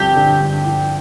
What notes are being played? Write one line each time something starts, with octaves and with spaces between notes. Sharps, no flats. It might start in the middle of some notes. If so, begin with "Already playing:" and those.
Already playing: G2 D3 F3 C4 G4
D3
G2
F3